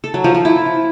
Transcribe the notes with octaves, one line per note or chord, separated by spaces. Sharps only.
A4
F#3
F3
F3
E4